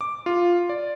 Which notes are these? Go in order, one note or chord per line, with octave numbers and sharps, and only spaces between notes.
D6
F4
D5